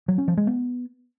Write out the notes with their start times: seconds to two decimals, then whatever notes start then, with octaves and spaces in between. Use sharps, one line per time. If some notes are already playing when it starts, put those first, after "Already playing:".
0.08 F#3
0.18 C#4
0.28 F3
0.37 G#3
0.47 B3